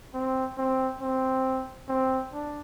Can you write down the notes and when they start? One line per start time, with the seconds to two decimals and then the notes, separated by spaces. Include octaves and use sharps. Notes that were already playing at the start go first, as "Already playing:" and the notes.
0.14 C4
0.57 C4
1.01 C4
1.88 C4
2.32 D4